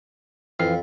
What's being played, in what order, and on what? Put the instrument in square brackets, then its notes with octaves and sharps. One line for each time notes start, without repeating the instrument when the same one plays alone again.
[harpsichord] F2 [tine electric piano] E3 F5 C7